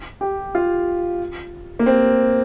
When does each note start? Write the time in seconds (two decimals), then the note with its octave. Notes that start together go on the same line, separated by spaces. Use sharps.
0.21 G4
0.55 F4
1.79 A#3
1.86 C4